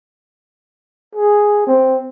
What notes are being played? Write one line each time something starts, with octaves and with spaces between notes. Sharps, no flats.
G#4
C4